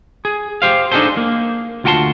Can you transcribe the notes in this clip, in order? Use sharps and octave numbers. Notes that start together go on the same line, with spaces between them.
G#4
G4 C5 F5
D4 D#4 F#4 G#4 A4 C5
A#3
D2 F4 F#4 G5 A5 C6